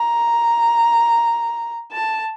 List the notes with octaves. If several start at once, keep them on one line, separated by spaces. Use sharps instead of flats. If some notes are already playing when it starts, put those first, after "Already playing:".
Already playing: A#5
A5